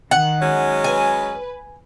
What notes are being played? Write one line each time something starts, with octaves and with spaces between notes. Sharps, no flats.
D#3 F#5
F#3 G#3 C#4
B4 G#5